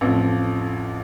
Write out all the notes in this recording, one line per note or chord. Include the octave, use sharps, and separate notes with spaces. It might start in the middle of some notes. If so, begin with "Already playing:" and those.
A1 F2 F3